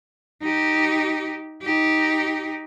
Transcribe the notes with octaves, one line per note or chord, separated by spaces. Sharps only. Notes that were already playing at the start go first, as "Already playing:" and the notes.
D#4 G4
D#4 G4